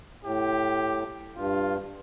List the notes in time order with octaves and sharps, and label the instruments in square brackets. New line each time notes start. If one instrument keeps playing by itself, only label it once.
[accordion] A2 [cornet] G4
[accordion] G2 [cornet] F4